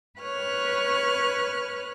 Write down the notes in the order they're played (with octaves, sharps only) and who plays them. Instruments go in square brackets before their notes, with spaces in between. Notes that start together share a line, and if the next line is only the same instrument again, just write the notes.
[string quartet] B4 C#5 F6 F#6